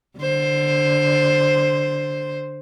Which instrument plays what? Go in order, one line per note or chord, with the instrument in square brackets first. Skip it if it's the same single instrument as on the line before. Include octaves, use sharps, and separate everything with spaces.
[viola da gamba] D3 C5